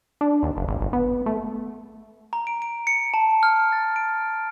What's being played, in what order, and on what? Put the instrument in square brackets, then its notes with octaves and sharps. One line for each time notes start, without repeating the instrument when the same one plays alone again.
[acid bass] D4
D#2
F#1
G#1
G1
B3
A3
[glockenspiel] A#5
D7
D7
C#7
A5
F6
A6
D7